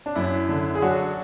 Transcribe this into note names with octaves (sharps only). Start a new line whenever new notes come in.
D4
F#2 E4
D3
G#4
F#3 D4 F#4